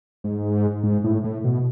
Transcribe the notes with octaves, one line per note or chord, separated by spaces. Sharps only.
G#2
G#2
A2
A2
B2